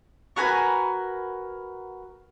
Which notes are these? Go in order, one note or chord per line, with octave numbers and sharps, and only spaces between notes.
F#4 A#4 B4 G#5